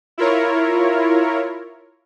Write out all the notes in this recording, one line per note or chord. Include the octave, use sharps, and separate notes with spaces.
E4 F4 A#4 C#5